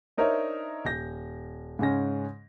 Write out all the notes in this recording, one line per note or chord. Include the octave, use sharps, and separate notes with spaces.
D4 D#4 A#4 C5 C#5 E5
D#1 G6 A#6
G#2 C#3 G#3 C#4 A#6